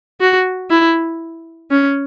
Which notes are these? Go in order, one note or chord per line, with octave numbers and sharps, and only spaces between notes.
F#4
E4
C#4